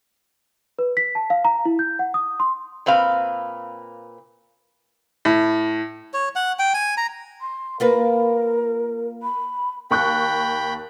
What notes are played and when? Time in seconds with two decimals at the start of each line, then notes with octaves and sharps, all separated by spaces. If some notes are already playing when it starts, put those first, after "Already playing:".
0.79 B4
0.97 B6
1.15 A5
1.30 F5
1.45 A#5
1.65 E4
1.79 G6
1.99 F#5
2.14 D#6
2.40 C6
2.86 A#2 C4 B4 F5
5.25 A2
6.14 C#5
6.36 F#5
6.59 G5
6.74 G#5
6.97 A#5
7.41 C6
7.80 A#3 F4 A#4 B4
9.23 B5
9.91 D#2 G5 B5 C#6 F#6